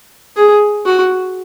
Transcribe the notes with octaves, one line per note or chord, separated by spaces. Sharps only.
G#4
F#4